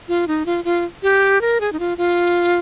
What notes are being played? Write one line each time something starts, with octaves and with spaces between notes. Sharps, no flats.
F4
D#4
F4
F4
G4
A#4
G#4
D#4
F4
F4